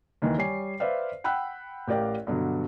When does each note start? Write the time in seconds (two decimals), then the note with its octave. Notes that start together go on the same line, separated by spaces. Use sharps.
0.22 D#2 D#3 E3
0.38 G3 C#5 G#5 C7
0.80 B4 C5 D5 E5 F5
1.24 F#5 G5 B5 E6 F#6
1.88 A1 G4 A#4 D5 F5 G5
2.27 G2 B2 D3 F#3